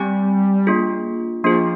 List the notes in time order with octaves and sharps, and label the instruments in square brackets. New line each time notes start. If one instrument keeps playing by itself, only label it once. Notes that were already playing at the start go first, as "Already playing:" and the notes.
Already playing: [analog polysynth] G3 [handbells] C4 G4 D5 G#5
[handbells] A#3 D4 F4 G#4
[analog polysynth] F3 [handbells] A#3 D4 F4 G#4